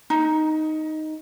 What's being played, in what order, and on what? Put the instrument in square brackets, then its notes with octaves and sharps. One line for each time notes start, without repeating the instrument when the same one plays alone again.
[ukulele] D#4